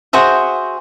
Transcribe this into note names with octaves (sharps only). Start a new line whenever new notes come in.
F#4 G#4 C5 E5